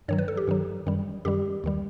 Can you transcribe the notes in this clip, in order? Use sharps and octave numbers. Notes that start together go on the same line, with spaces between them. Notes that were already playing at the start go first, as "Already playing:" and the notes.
G2 D#3 F#3 C#5
B4
A4
G4
G2 D#3 F#3
F#2 D#3 G3
F#2 D#3 G3 G4
D#2 D#3 G3